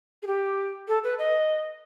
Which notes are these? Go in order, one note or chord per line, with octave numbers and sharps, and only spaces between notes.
G#4
G4
A4
B4
D#5